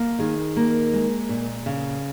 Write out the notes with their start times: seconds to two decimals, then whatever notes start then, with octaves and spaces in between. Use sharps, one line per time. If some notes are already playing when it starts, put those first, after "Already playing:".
Already playing: A#3
0.19 D#3 G#4
0.57 A#3
0.93 G#3
1.29 A#2
1.66 C#3